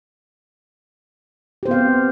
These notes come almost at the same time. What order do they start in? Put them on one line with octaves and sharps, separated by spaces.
G4 C5 B3 F5 C4